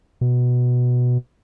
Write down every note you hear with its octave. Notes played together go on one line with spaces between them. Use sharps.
B2